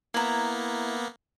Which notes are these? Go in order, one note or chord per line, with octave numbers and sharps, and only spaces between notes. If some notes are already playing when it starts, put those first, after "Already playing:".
A#3 B3 E4 A#5